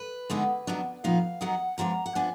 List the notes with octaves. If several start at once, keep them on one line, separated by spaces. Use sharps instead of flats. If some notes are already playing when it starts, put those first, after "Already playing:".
Already playing: B4
D3 G#3 B3 D#4
D#3 F#3 B3 D4
A#2 F3 B3 D#4 F5
D#3 F#3 B3 D#4 F#5
F3 G#3 B3 D4 A#5
F#5
F3 B3 D4 G#5